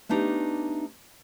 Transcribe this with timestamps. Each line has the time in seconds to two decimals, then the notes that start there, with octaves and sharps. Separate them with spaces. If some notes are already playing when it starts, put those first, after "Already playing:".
0.09 A3 B3 D4 D#4 G4